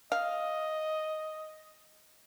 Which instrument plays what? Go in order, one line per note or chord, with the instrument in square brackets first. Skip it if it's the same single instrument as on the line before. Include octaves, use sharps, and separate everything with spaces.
[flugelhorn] D#5 [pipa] F5